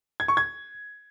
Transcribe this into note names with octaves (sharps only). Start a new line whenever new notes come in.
G#6
C#6
G#6